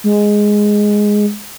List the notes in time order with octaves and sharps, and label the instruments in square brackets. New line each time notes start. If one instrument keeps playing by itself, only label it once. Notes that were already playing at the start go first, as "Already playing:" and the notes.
[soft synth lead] G#3